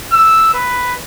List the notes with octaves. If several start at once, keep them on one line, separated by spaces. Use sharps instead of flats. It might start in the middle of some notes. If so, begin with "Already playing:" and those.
E6
B4